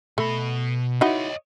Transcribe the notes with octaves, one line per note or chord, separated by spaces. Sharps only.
B2 A3 B5
D#4 E4 F#4 C#5 D#5